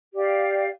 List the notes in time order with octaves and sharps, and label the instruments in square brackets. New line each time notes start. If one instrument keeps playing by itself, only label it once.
[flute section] G4 D5 F5